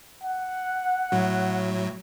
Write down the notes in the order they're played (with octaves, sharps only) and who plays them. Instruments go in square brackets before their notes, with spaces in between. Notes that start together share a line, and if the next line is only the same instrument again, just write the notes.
[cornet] F#5
[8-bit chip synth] A2 F#3